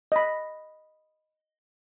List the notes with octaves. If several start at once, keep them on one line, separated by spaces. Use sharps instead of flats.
D#5 B5